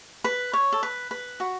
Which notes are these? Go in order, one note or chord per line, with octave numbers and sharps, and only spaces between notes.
B4
C#5
A4
B4
B4
F#4